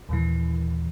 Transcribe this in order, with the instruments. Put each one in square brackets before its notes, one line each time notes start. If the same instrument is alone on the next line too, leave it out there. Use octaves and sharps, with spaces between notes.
[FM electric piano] D#2 A#2 E3